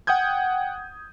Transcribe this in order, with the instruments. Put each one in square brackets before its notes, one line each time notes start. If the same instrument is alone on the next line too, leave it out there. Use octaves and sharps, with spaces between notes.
[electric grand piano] F#5 G5 D#6 G6 G#6